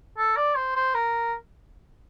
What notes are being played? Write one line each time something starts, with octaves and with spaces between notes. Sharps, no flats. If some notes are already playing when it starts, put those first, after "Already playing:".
A4
D5
C5
C5
A#4